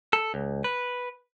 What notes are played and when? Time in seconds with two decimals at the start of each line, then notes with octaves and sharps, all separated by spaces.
0.13 A4
0.34 C#2
0.64 B4